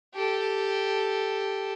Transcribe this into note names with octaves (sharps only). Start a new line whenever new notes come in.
G4 A4